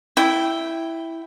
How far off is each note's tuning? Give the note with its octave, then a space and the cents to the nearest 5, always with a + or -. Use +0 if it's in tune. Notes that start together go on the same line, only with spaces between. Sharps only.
E4 +0 G5 +0